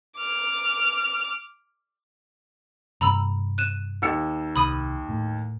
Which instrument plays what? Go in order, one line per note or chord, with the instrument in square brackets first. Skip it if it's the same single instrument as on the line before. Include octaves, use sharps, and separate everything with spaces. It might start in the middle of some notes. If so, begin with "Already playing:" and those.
[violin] D6 F6
[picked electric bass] G2 C3 [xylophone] A#5 B5 E6
[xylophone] F#6 D#7 E7
[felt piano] D#2 E6 C#7
[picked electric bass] C2 [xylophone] B5 D#6 D#7
[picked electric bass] A2